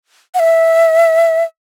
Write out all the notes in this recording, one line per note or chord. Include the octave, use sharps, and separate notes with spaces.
F#5
E5